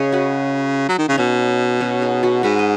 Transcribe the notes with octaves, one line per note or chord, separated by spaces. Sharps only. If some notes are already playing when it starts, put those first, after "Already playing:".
Already playing: C#3 G#4 C#5 D#5
F#4 B4
F#3
D#3
C#3 D#4
B2 C#4
C#4 F#4
D#4 G#4
F#4 B4
G#2 F#4 B4
D#5